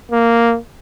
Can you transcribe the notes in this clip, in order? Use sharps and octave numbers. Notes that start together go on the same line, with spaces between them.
A#3